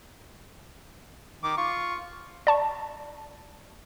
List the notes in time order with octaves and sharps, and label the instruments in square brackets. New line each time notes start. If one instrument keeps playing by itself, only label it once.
[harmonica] D#3 D6
F4 C#6
[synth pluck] D5 A5 C#6